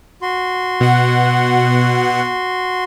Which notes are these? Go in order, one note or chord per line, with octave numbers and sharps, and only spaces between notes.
F#4 C6
B2 F#5